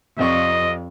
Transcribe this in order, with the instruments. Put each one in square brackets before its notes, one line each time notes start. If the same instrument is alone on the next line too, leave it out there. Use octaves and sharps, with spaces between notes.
[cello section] F2 [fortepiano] C3 D5 C#6 [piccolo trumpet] D#5